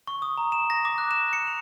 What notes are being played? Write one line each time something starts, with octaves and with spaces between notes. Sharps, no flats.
C#6
D#6
A#5
E7
A#6
D6
F#6
E7
C#7
F7